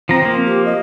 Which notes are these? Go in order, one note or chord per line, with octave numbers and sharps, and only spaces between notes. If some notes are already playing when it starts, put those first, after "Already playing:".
F3 C4 A#5
F3 A#3
G4
D#5